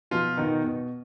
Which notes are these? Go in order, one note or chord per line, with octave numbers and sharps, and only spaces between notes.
B2 F3 F4
B2 D#3 D#4
B2